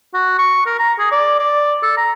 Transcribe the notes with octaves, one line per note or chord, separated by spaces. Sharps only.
F#4
C#6
A#4
A#5
G#4
D5
D5
A4
A#5